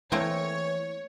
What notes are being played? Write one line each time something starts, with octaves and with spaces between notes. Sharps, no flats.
E3 A3 A#3 C4 C#5